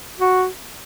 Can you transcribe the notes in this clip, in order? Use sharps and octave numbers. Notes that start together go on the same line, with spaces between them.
F#4